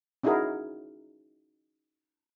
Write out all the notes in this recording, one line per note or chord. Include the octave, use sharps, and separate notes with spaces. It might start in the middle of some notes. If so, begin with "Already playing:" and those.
C#4 D#4 E4 F#4 G#4 A#4